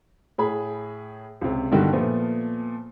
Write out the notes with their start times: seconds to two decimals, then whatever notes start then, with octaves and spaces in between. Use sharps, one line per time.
0.38 A2 G#4 B5
1.41 C#2 C3
1.72 G2 B2 D3 D#3 G3
1.92 A#2 F3 A3 B3